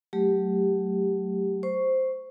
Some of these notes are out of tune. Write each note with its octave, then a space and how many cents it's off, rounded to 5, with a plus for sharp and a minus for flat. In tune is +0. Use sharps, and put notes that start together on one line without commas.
F#3 +20 A3 +0 G4 +0
C5 +0 C#6 +0